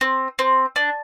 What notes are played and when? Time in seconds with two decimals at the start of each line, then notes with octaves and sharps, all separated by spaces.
0.01 C4
0.39 C4
0.76 D4